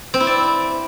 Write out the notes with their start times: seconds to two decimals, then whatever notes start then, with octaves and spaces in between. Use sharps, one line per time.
0.14 C4
0.20 E4
0.27 D5